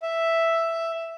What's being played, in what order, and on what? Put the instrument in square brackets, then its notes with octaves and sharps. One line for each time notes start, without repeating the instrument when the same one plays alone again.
[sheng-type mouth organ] E5